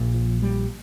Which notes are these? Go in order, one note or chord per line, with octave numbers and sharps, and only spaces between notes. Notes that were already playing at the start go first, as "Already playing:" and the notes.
Already playing: A#1 A#2
F3
G3